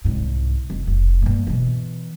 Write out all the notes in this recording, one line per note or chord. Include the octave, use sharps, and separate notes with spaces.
C2 G#2
F1
F1
G2 A#3
B2 E3